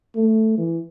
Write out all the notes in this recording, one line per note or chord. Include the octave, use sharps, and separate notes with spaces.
A3
E3